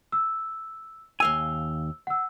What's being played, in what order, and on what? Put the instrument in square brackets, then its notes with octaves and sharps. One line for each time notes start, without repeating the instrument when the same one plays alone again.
[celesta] E6
[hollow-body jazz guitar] D#2 F5 G#5 [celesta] E6 G7
[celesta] F#5 E6